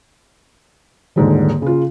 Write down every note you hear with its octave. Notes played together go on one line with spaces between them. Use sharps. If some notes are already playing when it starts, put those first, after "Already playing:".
D#1 G#2 D3
C#3 F4